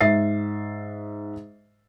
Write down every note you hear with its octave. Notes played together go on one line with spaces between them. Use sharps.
G#2 E5 A6 C7